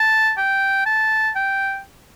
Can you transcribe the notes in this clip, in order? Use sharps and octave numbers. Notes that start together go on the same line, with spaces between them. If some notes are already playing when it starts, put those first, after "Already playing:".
Already playing: A5
G5
A5
G5